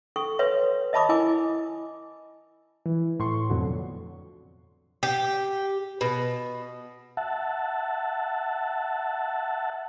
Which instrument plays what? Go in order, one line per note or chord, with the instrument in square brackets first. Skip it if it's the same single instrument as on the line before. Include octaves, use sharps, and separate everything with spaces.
[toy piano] A4 G5 C#6
B4 C#5 E5 C6
D#5 E5 A5 B5 D6 D#6
E4 A#4 D#5 G#5 D6
[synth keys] E3
A2 C6 C#6
F2 B2 D3 F#3
[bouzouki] G4
B2
[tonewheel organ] E5 F#5 A5